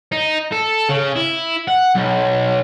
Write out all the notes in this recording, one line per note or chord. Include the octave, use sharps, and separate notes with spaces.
D#4
A4
C#3
E4
F#5
B1